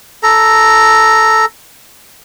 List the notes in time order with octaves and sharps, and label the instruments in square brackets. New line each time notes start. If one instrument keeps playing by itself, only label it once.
[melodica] A4 A#5